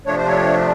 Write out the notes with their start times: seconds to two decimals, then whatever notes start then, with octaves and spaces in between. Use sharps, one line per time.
0.06 C3 F3 A3 D4 C#5
0.17 C5
0.27 C#5